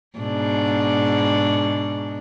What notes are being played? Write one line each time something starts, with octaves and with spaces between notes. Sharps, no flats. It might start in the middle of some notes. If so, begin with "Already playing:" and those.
G#2 B2 D4